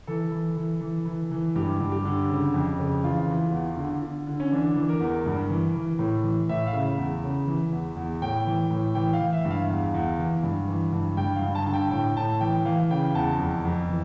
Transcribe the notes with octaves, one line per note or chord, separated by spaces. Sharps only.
E3 A4
E3
E3
E3
E3
E3
G2 G4
G2
G4
D3
C#3
F2
C#3
E3 F4
E3
E2
D3
D3
D3
C#4
E3 D4
E3
A#4
E2
G2
E3
E3
A2
E3
A2 E5
F5
C#3 E5
E2
C#3
E3
E2
E2
A2 G5
E3
A2
E3 G5
F5
E3
E5
G2
F5
E2
E2
E3
G2
E3
G2
G2 G5
F5
G2
A5
D3 A5
G5
A2 G5
A2 A5
E3 G5
E3 F5
C#3 G5
E2 A5
F2
F2
E3